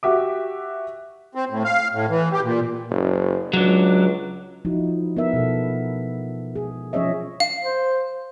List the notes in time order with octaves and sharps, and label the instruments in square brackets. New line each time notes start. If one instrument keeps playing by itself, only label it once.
[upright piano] F#4 G4 E5 D6
[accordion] C4
A2
F5
A2
E3
G4
A#2
[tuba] F#1
[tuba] C#2 [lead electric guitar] F#3 D4
[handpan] F3 D#4 E4 F#4
B3 E4 A#4 E5
B2 A4
G#4
F3 C#4 G#4 C#5 D#5 E5
[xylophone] F5
[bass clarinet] C5